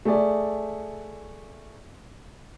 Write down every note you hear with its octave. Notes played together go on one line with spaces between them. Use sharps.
A3 G#4 D5